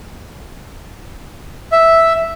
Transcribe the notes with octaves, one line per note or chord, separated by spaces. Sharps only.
E5